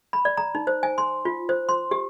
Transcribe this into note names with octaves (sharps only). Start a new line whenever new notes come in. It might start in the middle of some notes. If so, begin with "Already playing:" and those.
B5
D5
A#5
D#4
C5
G#5
C6
F4
C5
C6
G4